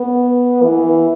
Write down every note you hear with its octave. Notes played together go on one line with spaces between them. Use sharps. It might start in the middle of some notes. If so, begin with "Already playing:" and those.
Already playing: B3
E3